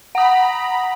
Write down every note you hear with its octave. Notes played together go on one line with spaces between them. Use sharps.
F#5 A#5 B5 D#6